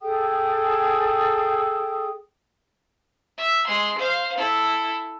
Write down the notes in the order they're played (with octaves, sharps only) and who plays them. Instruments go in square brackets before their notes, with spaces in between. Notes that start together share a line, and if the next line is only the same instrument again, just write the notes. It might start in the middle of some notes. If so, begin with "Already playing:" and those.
[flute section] G#4 A4 G5 D#6
[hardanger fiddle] E5
G#3 C6
C5 F5
E4 A4